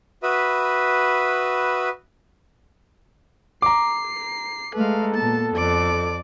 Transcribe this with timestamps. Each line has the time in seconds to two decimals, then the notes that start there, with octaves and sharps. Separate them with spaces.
0.23 F#4 B4 E5 B5 D#6
3.62 A#5 D6 C7
4.75 G#3 A3 A4 B4 F5
5.15 A#2 B3 A5
5.56 F2 D5 D6